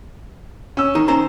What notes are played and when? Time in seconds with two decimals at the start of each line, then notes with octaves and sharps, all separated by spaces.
0.77 C#4 E6
0.95 D#3 D#4
1.08 C#4 C5 A#5